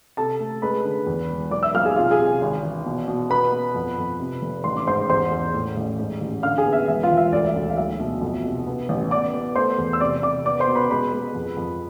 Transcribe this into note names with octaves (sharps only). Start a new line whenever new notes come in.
C3 A4 A5
A3
G#3 B4 B5
D3
E2
E1
B1 D5 D6
E5 E6
B1 F5 F6
G#4 G#5
C3 F4 F5
G#4 G#5
C3
G#1
E3
B2
B2
B3 B4 B5
B3
F2
F2
C3
F1
A1 C6
D6
G#2 C5 C6
E2 C5 C6
E2
A2
A1
G#2
A1
D3 F5 F6
G#4 G#5
B3
E5
E1 E5
F4 F5
E1
E5
D2 D5
E5
D2
F5
B1 E5
B2
F2
C3
B3
A1
B3 D5 D6
B3
A3 C5 C6
E2
E6
C3 D5 D6
C3 D5 D6
B3 D5 D6
C5 C6
B2
B4 B5
G#3 B4 B5
G#3
F2
F2